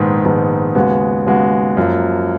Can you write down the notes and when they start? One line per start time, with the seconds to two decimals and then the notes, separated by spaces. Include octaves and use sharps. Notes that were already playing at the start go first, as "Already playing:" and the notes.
Already playing: A#1 G#2 D#3 G#3 B3
0.24 A#1 G#2 D#3 G#3 B3
0.75 D#2 C#3 G#3 B3 F#4
1.26 D#2 C#3 G#3 B3 F#4
1.77 F#2 F3 A#3